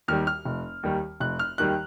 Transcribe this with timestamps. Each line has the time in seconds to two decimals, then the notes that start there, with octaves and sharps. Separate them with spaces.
0.08 D#2 D#3 G3 F6
0.27 F6
0.45 F1
0.83 D#2 D#3 G3
1.20 F1 F#6
1.39 F6
1.58 D#2 D#3 G3 F#6